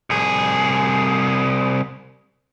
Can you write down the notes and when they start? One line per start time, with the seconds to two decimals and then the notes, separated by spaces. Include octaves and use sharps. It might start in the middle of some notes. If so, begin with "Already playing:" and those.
0.10 C2 G#4